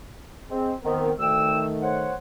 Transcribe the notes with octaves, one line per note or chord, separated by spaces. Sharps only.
C4 G#4 D#5
D#3 B3 C4 A#4
D2 D#3 A3 G5 E6
C5 C#5 F#5